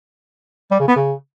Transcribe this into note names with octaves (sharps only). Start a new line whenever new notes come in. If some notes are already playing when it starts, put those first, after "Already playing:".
G3
C#3
B3
C#3